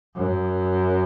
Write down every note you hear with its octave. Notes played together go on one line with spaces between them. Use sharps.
F#2